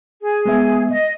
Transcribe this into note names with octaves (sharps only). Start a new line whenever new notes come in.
G#4
G#3 B3 E5
D#5